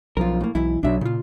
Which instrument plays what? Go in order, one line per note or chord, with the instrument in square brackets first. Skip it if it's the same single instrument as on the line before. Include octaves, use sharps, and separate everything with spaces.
[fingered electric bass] B1 F3 [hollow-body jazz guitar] F4 A#4
[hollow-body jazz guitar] A2 A#3
[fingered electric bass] B1 [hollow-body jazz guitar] G#2 E3 E4
[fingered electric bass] B1 B2 F#3 [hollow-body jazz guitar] D4 E5
[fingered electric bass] A#2 [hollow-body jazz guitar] C#3 F4